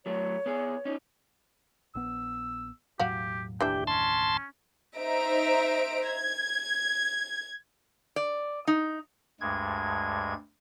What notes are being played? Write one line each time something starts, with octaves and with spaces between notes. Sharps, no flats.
F#3 A3 C#5
B3 G#4
C#4 D#4
A#1 B3 E6
E1 A2 F#3 F#4 G4 F5
F#1 D#2 A2 E3 D4 G4 E5 G5
C#4 A5 C6
D#4 C5 E5 A#5 D7
G#6
D5
D#4
D2 G2 G#3 G#6